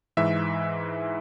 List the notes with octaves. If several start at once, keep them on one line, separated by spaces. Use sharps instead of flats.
G#2 E3 E5